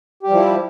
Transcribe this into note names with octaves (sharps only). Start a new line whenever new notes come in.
F3 G3 E4 G4